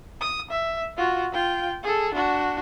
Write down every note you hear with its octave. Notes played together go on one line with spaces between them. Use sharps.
D#6
E5
F4 F#4
F4 G5
G#4 A4
D4 F#4